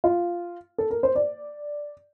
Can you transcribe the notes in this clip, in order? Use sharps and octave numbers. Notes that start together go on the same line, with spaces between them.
F4
A4
A#4
C5
D5